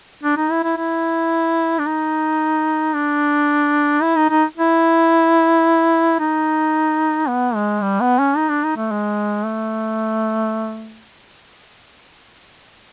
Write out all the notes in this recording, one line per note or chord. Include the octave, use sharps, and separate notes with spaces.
D4
D#4
E4
E4
E4
D4
D#4
D4
E4
D#4
D#4
E4
D#4
B3
G#3
G3
B3
C#4
D#4
D4
D#4
A3
G#3
A3